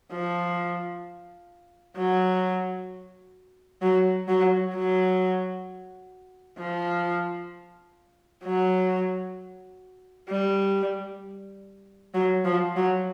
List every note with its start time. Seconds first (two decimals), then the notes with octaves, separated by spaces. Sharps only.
0.12 F3
1.97 F#3
3.82 F#3
4.28 F#3
4.75 F#3
6.58 F3
8.44 F#3
10.29 G3
12.14 F#3
12.45 F3
12.76 F#3